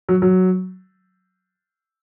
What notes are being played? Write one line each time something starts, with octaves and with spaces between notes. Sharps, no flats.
F#3
F#3